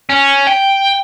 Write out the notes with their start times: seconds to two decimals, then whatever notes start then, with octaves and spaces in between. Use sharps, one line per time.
0.09 C#4
0.47 G5